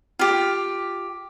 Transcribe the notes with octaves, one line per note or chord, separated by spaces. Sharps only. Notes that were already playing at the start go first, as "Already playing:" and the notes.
F4 G4